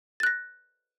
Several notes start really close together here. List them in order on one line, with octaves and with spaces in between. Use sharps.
A6 F#6 A#6